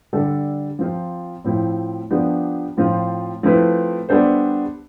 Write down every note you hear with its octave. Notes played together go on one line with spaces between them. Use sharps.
D3 G3 D4 A4
F3 C4 F4
A2 F3 C4 E4
F3 B3 D4 G4
A2 F3 C4 F4
F3 A3 C4 E4 B4
G3 B3 D4 A4 C5